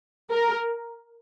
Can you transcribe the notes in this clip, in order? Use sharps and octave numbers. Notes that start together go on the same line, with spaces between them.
A#4